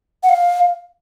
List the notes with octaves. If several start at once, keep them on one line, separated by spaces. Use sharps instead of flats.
F#5
F5